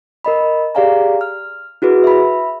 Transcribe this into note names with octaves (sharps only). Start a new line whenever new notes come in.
A#4 D#5 B5
G4 G#4 D5 F5 G#5 A#5
F6
E4 F#4 G#4 B4
E5 B5